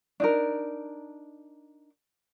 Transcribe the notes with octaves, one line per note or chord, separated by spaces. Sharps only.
D4 D#4 A#4